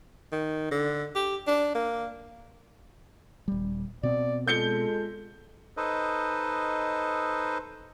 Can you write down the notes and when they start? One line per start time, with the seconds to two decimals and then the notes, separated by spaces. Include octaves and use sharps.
0.32 D#3
0.71 D3
1.16 G4
1.47 D4
1.75 A#3
3.48 D#1 G3
4.03 B2 C4 D5
4.48 G#3 F4 A4 G6 C#7 G7
5.77 D#4 A4 B4 C5 D#5